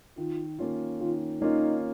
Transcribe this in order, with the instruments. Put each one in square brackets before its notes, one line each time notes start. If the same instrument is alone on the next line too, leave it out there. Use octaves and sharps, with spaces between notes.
[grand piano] D#3 [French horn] F4
[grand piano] A#3 C#4 F4
[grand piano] D#3 [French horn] F4
[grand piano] A#3 C#4 F4 [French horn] D#4